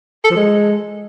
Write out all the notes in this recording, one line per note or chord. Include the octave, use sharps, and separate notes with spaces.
A4
F3
G#3